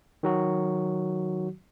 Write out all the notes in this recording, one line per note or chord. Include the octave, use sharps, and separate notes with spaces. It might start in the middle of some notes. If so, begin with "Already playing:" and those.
D#3 F#3 F#4